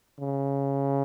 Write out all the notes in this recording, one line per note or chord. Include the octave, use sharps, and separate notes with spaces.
C#3